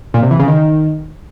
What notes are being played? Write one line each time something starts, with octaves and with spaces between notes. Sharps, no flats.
A#2
C3
E3
C#3
D#3